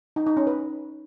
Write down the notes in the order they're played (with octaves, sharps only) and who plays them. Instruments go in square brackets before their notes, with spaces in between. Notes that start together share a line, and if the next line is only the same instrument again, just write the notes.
[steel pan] D#4
D#4
C#4
B4